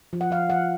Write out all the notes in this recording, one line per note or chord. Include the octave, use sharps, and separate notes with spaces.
F3
F#5
F3 F5
F3 F#5